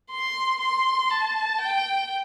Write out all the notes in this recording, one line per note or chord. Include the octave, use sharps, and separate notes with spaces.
C6
C6
A5
G5